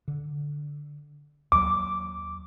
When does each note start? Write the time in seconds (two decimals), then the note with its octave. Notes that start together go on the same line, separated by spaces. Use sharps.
0.08 D3
1.52 D#2 F#3 D6